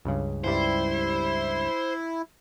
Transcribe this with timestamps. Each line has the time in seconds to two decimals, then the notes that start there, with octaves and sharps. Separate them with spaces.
0.05 C#2 G2 C#3
0.44 C#2 G2 G3 E4 C5